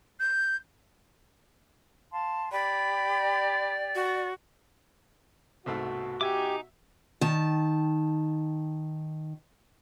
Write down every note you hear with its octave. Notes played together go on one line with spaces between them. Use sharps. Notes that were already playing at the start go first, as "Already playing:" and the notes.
G6
F5 A5 C6
G4 D5 G5 B5
F#4
C2 G#2 B2 A3 F#4
D#4 G4 E5 G#5 D6
D#3 A5